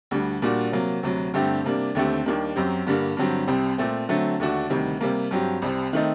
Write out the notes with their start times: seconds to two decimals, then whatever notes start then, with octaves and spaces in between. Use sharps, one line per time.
0.11 D2 D3 G3
0.42 A#2 G3 A#3 D4 F#4
0.72 C3 F#3 A#3
1.03 D2 C3 F#3
1.34 G2 D3 A3 C4 G4
1.64 C3 G3 A#3 D4
1.95 D#2 D3 A3 C4 G4
2.26 D#2 D#3 G3 A#3 D4
2.56 F#2 F#3 C4 G4
2.87 G2 D3 G3 A#3
3.17 G2 D3 F#3 C4 G4
3.48 C2 C3 G3 C4
3.78 A#2 A3 C4
4.09 D3 F#3 A3 C4
4.40 D#2 D3 A3 D4 F#4
4.70 D2 C3 D#3 G3
5.01 C3 G3 A#3
5.31 G2 F#3 C4 G4
5.62 C2 C3 G3 C4
5.93 D#3 A3 C4 D#4